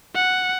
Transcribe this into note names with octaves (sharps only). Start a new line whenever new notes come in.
F#5